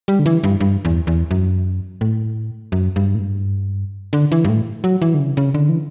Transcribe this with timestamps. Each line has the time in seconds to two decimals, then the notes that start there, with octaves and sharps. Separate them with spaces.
0.08 G3
0.19 D3
0.26 E3
0.44 G2
0.60 G2
0.85 E2
1.07 E2
1.31 F#2
2.01 A2
2.72 F#2
2.96 G2
3.15 A2
3.19 G2
4.13 D3
4.32 E3
4.45 G2
4.49 A2
4.84 F#3
5.02 E3
5.14 D3
5.19 C#3
5.37 C#3
5.54 D3
5.69 E3